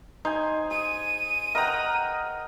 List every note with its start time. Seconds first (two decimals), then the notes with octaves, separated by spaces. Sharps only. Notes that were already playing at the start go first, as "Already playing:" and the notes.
0.25 D#4 C5 G#5
0.71 G#4 D#7
1.55 A#4 D#5 F#5 G5 A#5